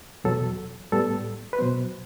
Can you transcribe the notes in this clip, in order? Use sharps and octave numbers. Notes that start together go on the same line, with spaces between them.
E2 B2 F#3 A4
A2 G3 B3 A4
B4
B2 F#3 B3 C5